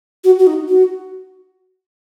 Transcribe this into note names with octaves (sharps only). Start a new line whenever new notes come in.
F#4
F#4
D#4
F#4